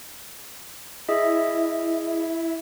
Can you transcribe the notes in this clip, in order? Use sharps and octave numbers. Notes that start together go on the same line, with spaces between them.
E4 G#4 D#5 E5